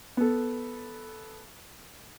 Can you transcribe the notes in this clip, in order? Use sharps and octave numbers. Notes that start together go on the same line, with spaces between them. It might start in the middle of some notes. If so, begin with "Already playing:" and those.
B3 A4